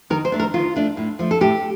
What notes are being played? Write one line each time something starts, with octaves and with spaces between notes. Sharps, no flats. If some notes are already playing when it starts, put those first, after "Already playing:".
D#3 A#4
C5
A3 D4
A#4
D#3 F4
A3 D4
A2
F3 A3
A4
A2 G4